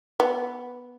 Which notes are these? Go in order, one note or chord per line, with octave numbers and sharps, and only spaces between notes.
B3